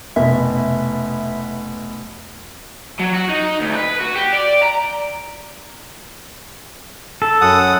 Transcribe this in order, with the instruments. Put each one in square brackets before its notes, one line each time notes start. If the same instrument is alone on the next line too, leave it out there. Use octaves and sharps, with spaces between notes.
[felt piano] F1 B2 [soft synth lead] E5
[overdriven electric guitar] F#3
F#4
D#4
D2
B4
F#4
G4
D5
A#5
[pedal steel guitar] A4
[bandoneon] F#2 F#5 D#6